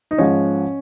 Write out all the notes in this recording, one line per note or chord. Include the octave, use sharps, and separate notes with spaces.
D#4
G#2 F3 C#4